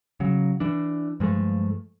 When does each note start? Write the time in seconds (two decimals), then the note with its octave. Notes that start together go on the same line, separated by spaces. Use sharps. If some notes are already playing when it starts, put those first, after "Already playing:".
0.20 C#3 F#3
0.60 E3 D4
1.20 G2 F3 G#3 A3